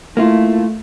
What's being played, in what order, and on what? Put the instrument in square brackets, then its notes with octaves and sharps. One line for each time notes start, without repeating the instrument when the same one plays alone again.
[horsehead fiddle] A3 [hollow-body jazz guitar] A#3 E4 F4